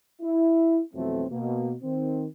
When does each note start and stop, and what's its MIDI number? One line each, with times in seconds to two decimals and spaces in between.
0.22 0.80 64
0.94 1.25 41
0.94 1.25 47
0.94 1.25 52
0.94 1.25 54
0.94 1.25 57
0.94 1.25 60
1.31 1.73 47
1.31 1.73 58
1.83 2.26 51
1.83 2.26 60